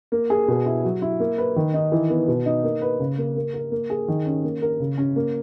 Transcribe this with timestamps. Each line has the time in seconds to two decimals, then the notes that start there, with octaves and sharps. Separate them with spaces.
0.12 A#3
0.30 G#4
0.48 B2
0.66 E4
0.84 F#3
1.02 E4
1.20 A#3
1.38 B4
1.56 D#3
1.74 D#4
1.92 E3
2.10 B3
2.28 B2
2.46 D#4
2.64 A#3
2.82 B4
3.00 C#3
3.18 A#3
3.36 A#3
3.54 A#4
3.71 A#3
3.90 G#4
4.08 D#3
4.26 C#4
4.44 A#3
4.62 A#4
4.80 C#3
4.98 C#4
5.16 A#3